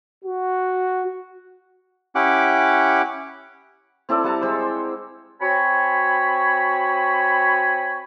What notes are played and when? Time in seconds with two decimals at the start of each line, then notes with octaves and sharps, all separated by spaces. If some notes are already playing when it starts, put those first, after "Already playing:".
0.24 F#4
2.15 C#4 E4 G4 F#5 D6
4.09 C4 E4 A4 D5
4.24 G3 F#5 A5 A#5
4.42 G#3 C5 E6
5.41 C4 F#4 C#5 G#5 B5 C#6